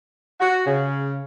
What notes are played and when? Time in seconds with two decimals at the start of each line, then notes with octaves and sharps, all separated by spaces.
0.40 F#4
0.66 C#3